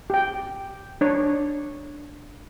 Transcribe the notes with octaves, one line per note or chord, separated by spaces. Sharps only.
G4 G5
D4 C#5